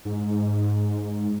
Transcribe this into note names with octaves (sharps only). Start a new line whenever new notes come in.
G#2